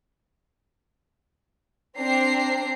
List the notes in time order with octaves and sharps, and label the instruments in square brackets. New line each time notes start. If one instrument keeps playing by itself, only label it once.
[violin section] C4 D4 A#5 C7